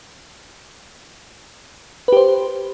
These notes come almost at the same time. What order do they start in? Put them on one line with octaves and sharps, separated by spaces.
B4 G4 C5